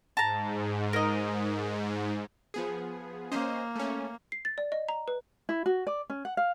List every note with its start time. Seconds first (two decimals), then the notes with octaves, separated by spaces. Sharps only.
0.17 G#2 A5 A#5
0.93 A#4 D#5
2.54 F3 B3 G#4
3.32 A#3 C#4 C5 D#5
3.75 A3 C#4
4.32 C7
4.45 A6
4.58 D5
4.72 D#5
4.89 A#5
5.08 B4
5.49 E4
5.66 F#4
5.87 D5
6.10 C#4
6.25 F#5
6.37 F5